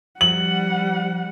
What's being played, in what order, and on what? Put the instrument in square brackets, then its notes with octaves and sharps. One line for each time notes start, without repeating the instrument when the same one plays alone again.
[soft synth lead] F3 [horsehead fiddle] G3 F#5 [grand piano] F#7